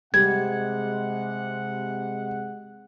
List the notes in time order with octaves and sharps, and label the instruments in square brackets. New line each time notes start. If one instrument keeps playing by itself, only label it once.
[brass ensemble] C3 G#3 F#5 [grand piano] G3 [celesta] G#6